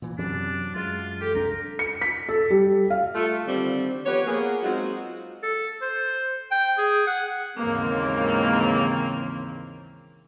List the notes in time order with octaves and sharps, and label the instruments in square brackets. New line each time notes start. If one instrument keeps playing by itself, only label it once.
[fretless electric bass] A#2 E3
[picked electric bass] F#2 C3 [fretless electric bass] E3 F#3 [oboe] D4
[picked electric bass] F#2 G#3 [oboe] F4
[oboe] G4 [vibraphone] A4
[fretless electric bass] C2 D4 [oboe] A#4
[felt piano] C#7
B6
A4
G3
F5
[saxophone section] A3 F4
D3 D#3 G3 C4
F3 B3 G4 B4 C#5
A#3 B3 G#4
F#3 G#3 C4 D#4 F4 F#4
[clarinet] A4
C5
G5
G#4
F#5
[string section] D#2 G#2 C#3 E3 A#3 C4